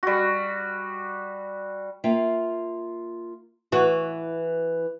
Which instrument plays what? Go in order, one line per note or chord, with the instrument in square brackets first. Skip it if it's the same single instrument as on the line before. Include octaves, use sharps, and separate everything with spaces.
[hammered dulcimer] G3 F#4
[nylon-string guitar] A#3 F4 E5 G5
[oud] E3 F#4